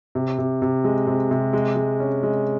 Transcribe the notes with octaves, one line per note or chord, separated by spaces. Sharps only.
C3
C3
C3
G#3
C3
C3
G#3
G#3
C#4
G#3